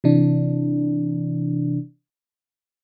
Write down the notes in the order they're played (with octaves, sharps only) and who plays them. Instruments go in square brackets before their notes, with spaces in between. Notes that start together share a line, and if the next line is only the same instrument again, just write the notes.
[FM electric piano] C3 E3 D4